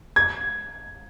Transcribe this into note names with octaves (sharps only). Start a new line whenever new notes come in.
G#6